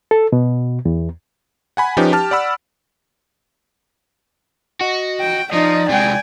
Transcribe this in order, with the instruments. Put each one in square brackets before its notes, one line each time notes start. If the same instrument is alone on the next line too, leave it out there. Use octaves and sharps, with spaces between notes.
[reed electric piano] A4
B2
E2
[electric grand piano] F#5 G#5 B5
F3 C#4 D#4 G4 B4
G4 A5 F6
D5 F#5 B5 E6
[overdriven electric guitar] F#4 [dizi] D#5
[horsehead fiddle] G5
[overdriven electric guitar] F3 [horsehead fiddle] D#4 D#5 [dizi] D5
[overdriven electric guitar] C3 G#3 [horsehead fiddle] G5 G#5